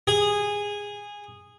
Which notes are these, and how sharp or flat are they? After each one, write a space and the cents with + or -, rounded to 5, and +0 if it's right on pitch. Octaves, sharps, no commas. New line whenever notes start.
G#4 -15